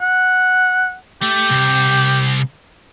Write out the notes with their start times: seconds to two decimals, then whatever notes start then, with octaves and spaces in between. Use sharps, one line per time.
0.01 F#5
1.22 A3 G4
1.51 C2